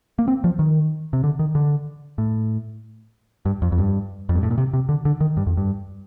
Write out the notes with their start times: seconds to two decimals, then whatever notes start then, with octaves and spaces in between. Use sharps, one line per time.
0.19 A#3
0.28 C4
0.44 F3
0.59 D#3
1.13 C3
1.24 D3
1.39 D#3
1.55 D3
2.18 A2
3.46 G2
3.62 F2
3.72 F2
3.78 G2
4.29 F2
4.35 G2
4.43 A2
4.51 A#2
4.58 C3
4.73 C3
4.89 D3
5.05 D3
5.21 D#3
5.37 G2
5.47 F2
5.57 G2